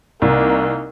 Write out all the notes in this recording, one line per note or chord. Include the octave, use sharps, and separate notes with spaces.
C2 A#3 D#4